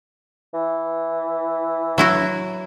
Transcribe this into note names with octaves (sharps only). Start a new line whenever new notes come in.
E3
F#3 E4 F#4